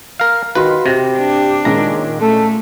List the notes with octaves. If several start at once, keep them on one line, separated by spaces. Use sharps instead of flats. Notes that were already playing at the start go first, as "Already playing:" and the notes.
A#4 F5
D#3 F4 F#4 B4 C6
C3 G4 A#6
D4
A#2 D#3 G#3 C#4 A#5
A3 A4